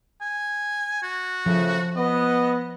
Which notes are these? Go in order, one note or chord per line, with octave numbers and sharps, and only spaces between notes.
G#5
F#4
C#3 F3 A3
B3 D#5